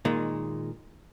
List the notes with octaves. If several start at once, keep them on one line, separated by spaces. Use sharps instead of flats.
A#2 D#3 G#3